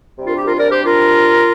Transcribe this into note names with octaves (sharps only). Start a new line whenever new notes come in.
C3 G3 D4
F4 A#4
G4
F4 A#4
A#4 D5
G4 C5
F4 A#4